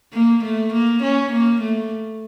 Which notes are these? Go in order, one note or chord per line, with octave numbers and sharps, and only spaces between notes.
A#3
A3
A#3
C#4
A#3
A3